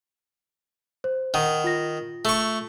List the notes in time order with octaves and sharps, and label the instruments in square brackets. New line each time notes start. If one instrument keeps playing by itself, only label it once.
[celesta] C5
[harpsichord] D#3 [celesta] F#5
[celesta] F4 A#6
[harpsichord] A3 C#6